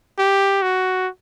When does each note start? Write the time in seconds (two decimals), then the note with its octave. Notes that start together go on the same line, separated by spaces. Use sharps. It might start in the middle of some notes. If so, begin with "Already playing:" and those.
0.19 G4
0.62 F#4